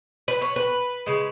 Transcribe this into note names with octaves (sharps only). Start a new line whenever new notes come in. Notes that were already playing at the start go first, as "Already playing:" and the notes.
B4
C#5
B4
C#3 G#3